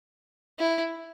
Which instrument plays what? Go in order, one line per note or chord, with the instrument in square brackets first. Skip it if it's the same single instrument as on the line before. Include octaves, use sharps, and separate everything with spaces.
[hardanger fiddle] E4